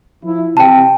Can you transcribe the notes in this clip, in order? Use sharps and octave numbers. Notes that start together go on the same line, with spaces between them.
F3 E4
C3 G5 A5